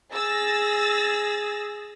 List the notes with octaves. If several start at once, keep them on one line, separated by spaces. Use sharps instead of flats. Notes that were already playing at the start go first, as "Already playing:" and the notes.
G#4 E6 A6 A#6